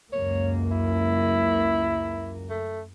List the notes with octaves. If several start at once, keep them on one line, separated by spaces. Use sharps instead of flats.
C#2 F#2 A#3 C#5
E4
A3